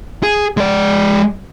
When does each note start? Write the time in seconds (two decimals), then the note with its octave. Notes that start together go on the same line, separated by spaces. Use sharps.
0.23 G#4
0.57 G#3 D5